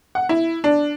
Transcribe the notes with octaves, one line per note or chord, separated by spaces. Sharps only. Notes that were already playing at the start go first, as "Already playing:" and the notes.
F#5
E4
D4